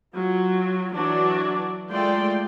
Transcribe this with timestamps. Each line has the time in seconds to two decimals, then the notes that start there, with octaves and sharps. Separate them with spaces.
0.16 F#3 F4
0.94 E3 F#3 D4 F#4 D5
1.90 G#3 A3 F4 D5 G5 C6